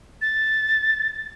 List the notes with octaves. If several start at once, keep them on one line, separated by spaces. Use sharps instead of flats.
A6